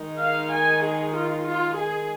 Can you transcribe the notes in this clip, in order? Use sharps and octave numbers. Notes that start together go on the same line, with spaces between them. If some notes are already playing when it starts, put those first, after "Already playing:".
Already playing: D#3 G#3 D#4
F5
G#5
G#4
F4
F4
G#4